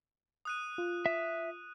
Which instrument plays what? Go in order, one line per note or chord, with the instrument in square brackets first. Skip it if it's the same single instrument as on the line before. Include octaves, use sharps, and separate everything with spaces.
[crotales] D#6 F#6 D#7
[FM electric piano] F4
[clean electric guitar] E5